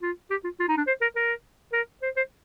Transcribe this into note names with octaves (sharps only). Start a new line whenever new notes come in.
F4
G4
F4
F4
D#4
D4
C5
A#4
A#4
A#4
C5
C5